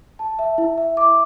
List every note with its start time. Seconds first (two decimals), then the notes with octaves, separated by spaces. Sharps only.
0.19 A5
0.39 E5
0.58 E4
0.78 E5
0.97 D6